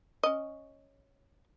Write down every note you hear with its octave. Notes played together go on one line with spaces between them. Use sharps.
C#4 D#5